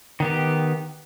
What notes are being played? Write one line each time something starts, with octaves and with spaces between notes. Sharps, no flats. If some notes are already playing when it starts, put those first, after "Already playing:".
D#3 B3 G4